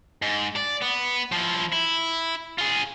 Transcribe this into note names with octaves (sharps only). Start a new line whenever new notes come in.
G#2
D5
B3
F3 E4
E4
F4 G#4